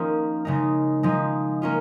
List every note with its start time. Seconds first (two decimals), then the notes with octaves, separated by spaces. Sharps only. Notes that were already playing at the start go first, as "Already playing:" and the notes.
Already playing: F3 A#3 C#4 D#4 F4
0.45 C#3 G#3 D#4
1.03 F3 G#3 D#4
1.62 A#3 C#4 F4